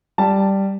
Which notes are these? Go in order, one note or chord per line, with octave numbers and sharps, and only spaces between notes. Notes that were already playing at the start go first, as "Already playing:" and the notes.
G3 A5